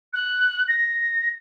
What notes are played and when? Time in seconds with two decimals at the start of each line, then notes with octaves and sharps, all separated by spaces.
0.13 F#6
0.68 A#6